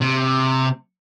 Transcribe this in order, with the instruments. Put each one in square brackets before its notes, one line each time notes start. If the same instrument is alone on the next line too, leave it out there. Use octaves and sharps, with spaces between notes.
[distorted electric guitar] C3